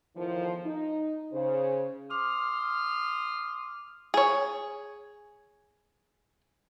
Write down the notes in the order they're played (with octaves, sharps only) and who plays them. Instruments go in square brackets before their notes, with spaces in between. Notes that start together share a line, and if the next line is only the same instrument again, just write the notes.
[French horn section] E2 A2 D#3 F3
D#4
C#3 C5
[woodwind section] C6 D#6 F6 [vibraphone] D6
[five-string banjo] G#4 C#5